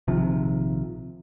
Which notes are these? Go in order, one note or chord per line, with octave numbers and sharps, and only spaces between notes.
A#1 C3 D#3 F3